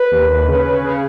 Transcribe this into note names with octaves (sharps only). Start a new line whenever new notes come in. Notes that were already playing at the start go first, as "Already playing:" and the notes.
Already playing: B4
D#2
D#2
C#3
C#3
C#3